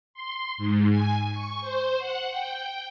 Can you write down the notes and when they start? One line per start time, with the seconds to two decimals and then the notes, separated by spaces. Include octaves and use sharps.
0.14 C6
0.58 G#2
0.89 G#5
1.32 C#6
1.61 C5
1.98 F#5
2.30 G5